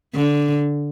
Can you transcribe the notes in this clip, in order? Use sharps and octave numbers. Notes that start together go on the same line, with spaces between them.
D3